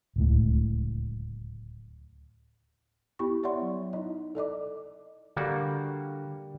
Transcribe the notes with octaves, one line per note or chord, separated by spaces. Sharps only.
D1 C#2 A2
B3 E4 G4 B5 C#6
C#5 D5 E5 F#5 C6
F#3
D#4 E4 D#5
A4 D5 D#5 D6
D3 G3 A#3 F#4